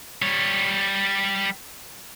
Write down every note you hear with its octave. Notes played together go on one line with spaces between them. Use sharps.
G3 C#5